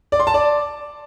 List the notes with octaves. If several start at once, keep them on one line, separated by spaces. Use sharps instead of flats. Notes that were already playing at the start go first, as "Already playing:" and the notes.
D5
C6
A5
D5